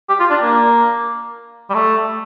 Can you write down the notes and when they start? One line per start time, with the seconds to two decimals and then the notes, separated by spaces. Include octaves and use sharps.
0.09 G4
0.20 F4
0.31 D4
0.42 A#3
1.70 G3
1.75 A3